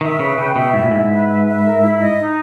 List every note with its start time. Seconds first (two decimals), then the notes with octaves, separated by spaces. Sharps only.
0.01 D#3 E5
0.19 C#3 B4
0.37 C#3 G5
0.56 B2 E5
0.73 G#2 E4
0.83 A#2
0.91 G#2 E5
1.10 B4
1.28 E5
1.45 E5
1.64 A#4
1.81 E4
2.00 D#5
2.18 D#4